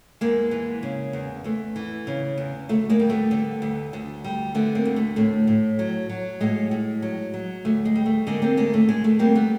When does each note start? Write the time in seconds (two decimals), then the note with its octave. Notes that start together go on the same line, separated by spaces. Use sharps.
0.21 E2 G#3 A#3
0.51 E3
0.83 C#3
1.13 E2
1.44 E2 A3
1.76 E3
2.07 C#3
2.38 E2
2.69 D2 A3
2.90 G#3 A#3
2.99 G3
3.10 A3 B3
3.31 D3
3.62 D2
3.93 D2
4.24 G3
4.55 D3 A3 B3
4.75 A#3 C4
4.85 D2
4.96 A3
5.16 A2 A3
5.47 A2
5.79 F#3
6.09 F#3
6.41 A2 G#3
6.71 A2
7.02 F#3
7.34 F#3
7.65 D2 A3
7.85 G#3
7.95 G3
8.06 A3
8.27 D3 G#3 A#3
8.42 A#3 C4
8.57 D2 G#3 A#3
8.74 A3
8.89 D2 G#3
9.04 A3
9.19 G3 A#3 C4
9.35 A3 B3